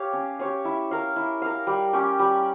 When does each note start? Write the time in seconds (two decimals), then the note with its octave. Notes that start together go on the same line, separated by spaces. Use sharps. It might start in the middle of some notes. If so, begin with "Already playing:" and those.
Already playing: G4 C#5 F5
0.13 C#4
0.39 G4 C#5 F5
0.65 E4
0.91 A#4 F5
1.16 E4
1.42 A#4 F5
1.67 G3
1.93 C#4 G4
2.19 G3